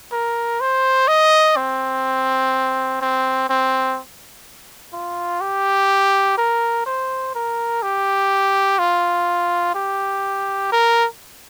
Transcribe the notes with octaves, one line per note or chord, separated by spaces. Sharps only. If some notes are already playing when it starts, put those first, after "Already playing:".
A#4
C5
D#5
C4
C4
C4
F4
G4
A#4
C5
A#4
G4
F4
G4
A#4